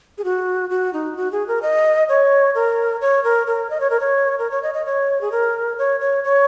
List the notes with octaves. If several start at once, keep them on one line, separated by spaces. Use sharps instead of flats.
G#4
F#4
F#4
D#4
F#4
G#4
A#4
D#5
C#5
A#4
C#5
A#4
A#4
D#5
C#5
A#4
C#5
A#4
C#5
D#5
D#5
C#5
G#4
A#4
C#5
C#5
C#5